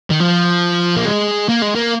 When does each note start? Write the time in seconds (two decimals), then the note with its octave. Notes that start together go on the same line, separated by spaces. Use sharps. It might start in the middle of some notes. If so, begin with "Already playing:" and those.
0.11 D#3
0.20 F3
0.97 A#3
1.06 G#3
1.49 A#3
1.62 G#3
1.75 A#3